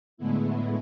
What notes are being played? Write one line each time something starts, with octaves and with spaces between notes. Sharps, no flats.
A2 D3 G#3 A3 B3 E4